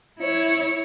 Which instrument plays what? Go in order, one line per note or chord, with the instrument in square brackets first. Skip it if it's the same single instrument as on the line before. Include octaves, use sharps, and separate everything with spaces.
[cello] E4 C#5